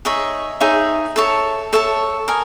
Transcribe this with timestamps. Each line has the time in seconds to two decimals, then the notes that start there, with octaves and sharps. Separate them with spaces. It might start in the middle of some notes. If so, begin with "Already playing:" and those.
0.05 D#4 G#4 C#5 E5
0.60 D#4 G#4 C#5 E5
1.16 A4 C#5 E5 A5
1.73 A4 C#5 E5 A5
2.28 A#4 D#5 G#5